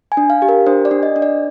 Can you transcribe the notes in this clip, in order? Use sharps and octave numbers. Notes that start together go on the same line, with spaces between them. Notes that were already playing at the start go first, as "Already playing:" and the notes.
G#5
D4
F5
G4
A#4
D4 C5
D5
D4
D#5
D4
D5